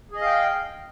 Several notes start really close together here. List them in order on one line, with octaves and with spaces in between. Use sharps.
G#4 D#5 F5 G5